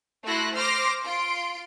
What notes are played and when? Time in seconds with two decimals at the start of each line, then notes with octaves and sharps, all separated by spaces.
0.24 A3 E4 F#4 C6 F#6 A#6
0.53 C5 C6 D6 F6 A#6
1.05 F4 C6 D7